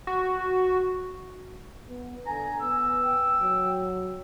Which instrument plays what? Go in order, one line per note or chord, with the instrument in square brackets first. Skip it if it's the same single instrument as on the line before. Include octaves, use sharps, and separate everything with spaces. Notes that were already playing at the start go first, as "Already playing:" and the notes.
[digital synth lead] F#4
[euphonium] B3
[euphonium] D3 [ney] G#5 [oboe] A#5
[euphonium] B3 [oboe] E6
[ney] G5
[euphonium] F#3